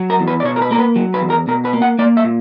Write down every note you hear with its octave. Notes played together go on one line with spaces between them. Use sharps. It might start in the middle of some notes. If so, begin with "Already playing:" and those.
Already playing: F#3
A#4
E2
B4
D5
B2 C#5
A#4
B4
A#3 A#4
B4
F#3
B4
E2
A#4
B2 A#4
B4
A#3
F#5
A#3 D5
E5
A#2